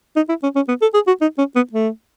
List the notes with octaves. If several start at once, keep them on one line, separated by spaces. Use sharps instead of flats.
D#4
E4
C#4
C#4
B3
A4
G#4
F#4
D#4
C#4
B3
A3